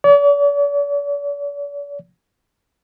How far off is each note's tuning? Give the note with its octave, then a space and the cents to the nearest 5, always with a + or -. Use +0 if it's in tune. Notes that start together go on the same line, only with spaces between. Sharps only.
D5 -45